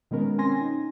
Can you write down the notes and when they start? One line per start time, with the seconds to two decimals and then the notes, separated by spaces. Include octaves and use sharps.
0.11 B2 D#3 G#3 B3 C#4 A#4
0.38 C4 C#4 G#5 C6 A#6
0.61 D#4